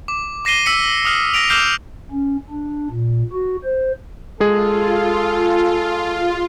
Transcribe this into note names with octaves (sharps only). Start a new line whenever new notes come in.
D6
D6 A#6 C7 D#7 G7
E6 B6 C#7
D#6 F6 C7
A#6 B6 D7 F7
D6 E6 F6 G6 C7 F7
C#4
D4
A#2
F#4
C5
G#3 F4 G#4 A4